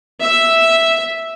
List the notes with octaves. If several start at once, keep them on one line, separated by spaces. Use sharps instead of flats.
E5